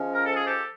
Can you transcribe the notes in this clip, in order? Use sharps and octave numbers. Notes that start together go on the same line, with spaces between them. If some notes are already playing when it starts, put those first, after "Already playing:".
Already playing: F3 G#3 C#4
A#4
A4
G#4
G4 A4